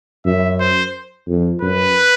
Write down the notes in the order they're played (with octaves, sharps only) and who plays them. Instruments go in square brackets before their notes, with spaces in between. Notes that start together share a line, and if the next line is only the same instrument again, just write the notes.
[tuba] F#2 [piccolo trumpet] E5
[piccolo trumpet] C5
[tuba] F2
[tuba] F#2 [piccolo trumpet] B4